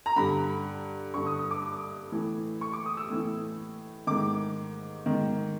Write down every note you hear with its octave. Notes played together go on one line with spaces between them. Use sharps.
A#5
G2 D3 B5
G2 D3 C#6
D#6
D#6
D6
A2 E3
C#6
D6
D#6
E6
A2 E3
G#2 D#3 D6
G#2 D#3